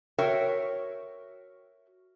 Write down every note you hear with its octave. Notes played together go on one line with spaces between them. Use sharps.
F#4 A#4 C#5 E5 G5